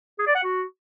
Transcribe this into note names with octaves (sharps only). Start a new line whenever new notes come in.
G#4
D5
F#5
F#4